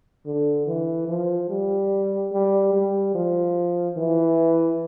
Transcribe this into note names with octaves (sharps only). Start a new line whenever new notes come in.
D3
E3
F3
G3
G3
G3
F3
E3